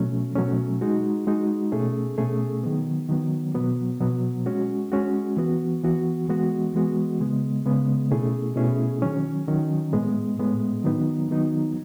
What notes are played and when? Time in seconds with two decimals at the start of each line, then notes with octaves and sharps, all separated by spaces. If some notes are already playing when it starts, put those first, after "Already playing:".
Already playing: B2 F#3 A3 C#4
0.35 B2 F#3 A3 C#4
0.81 G#3 D#4 F#4
1.27 G#3 D#4 F#4
1.72 B2 A3 C#4 G#4
2.18 B2 A3 C#4 G#4
2.63 D#3 F#3 B3
3.09 D#3 F#3 B3
3.55 B2 F#3 B3
4.01 B2 F#3 B3
4.46 G#3 C#4 F#4
4.92 G#3 C#4 F#4
5.37 E3 B3 F#4
5.83 E3 B3 F#4
6.28 E3 G#3 B3 F#4
6.74 E3 G#3 B3 F#4
7.20 C#3 G#3 B3
7.66 C#3 G#3 B3
8.11 B2 A3 C#4 E4 G#4
8.56 B2 A3 C#4 E4 G#4
9.02 D#3 F#3 C#4
9.47 D#3 F#3 C#4
9.93 A2 G#3 B3
10.39 A2 G#3 B3
10.84 D#3 F#3 B3 D#4
11.30 D#3 F#3 B3 D#4